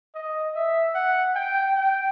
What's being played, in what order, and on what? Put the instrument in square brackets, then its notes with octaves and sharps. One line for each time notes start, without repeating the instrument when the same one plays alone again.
[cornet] D#5
E5
F#5
G5
G5